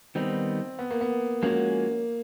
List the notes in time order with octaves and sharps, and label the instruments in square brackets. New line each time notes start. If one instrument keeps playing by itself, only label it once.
[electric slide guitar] D#3 G3 B3 D#4 [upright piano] C4
[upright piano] B3
A#3
B3
[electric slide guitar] F3 G#3 C#4 F#4 [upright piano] A#3